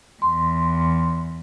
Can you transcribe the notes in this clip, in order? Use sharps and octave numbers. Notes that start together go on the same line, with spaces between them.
E2 C6